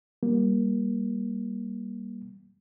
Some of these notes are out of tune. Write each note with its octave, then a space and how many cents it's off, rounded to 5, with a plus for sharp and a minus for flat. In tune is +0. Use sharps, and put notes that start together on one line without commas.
G3 +0 A#3 +20